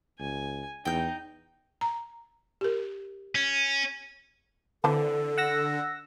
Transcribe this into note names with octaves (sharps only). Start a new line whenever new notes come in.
C#2 G#5
E2 D#4 G5 G6
A#5
G4 A#4
C#4
D3 E3 C4 A4 A5
F#5 E6 A#6